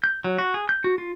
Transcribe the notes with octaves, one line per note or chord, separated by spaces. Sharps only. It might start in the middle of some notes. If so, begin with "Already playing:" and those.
G6
F#3
F#4
G#4
G6
F#4
F4